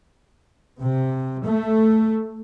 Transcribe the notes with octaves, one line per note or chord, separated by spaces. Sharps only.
C3
A3